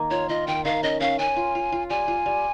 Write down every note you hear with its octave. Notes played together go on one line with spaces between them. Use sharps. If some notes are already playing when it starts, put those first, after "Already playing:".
Already playing: D#3 A#3
F4 C#5
F4 D#5
D#3 G5
D#3 F5
C#4 D#5
C#4 F5
C#4 G#5
F4
F4
F4
G3 G#5
F4
G3